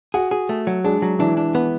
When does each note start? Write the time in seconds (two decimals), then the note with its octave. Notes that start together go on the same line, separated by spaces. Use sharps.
0.14 F#4 G#4 F#5
0.31 G#4
0.49 A3
0.67 F#3
0.84 G#3 D4 G#4
1.02 F#3
1.19 E3 D4 E4
1.37 D4
1.55 B3